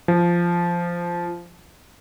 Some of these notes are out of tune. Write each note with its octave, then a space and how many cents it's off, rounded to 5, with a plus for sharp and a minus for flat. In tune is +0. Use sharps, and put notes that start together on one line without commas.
F3 -10